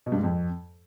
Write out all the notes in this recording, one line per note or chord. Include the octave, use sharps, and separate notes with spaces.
B2
G2
G#2
F2